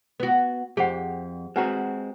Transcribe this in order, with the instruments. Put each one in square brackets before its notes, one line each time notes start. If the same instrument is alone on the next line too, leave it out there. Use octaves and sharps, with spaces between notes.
[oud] B3 F#4
[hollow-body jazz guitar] F2 [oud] G4 [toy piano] G#4 C5 F#5
[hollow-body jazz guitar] G#3 C4 F#4 [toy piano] B4 F#5 A#5